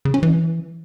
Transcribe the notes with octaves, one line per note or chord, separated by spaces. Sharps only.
C#3
C#4
E3